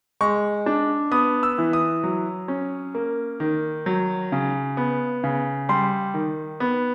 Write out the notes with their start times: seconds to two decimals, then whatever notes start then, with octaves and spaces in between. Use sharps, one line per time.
0.21 G#3 C#6
0.66 D4
1.11 B3 D#6
1.43 E6
1.58 E3
1.73 D#6
2.04 F#3
2.48 C#4
2.95 A#3
3.40 D#3
3.86 F#3
4.32 C#3
4.77 B3
5.24 C#3
5.69 G3 C6
6.14 D#3
6.60 B3